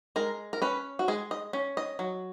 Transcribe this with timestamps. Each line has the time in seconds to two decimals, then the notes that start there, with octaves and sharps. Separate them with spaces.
0.16 G#3 A#4
0.53 A#4
0.62 C#4 B4
0.99 F#4
1.08 G#3 G#4
1.31 D#5
1.53 C#4
1.77 D#5
1.99 F#3